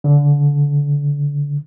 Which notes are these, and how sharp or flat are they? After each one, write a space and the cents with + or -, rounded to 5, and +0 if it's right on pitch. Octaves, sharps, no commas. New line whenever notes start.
D3 -30